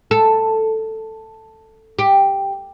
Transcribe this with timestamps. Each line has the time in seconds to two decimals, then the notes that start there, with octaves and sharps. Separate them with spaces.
0.11 A4
1.99 G4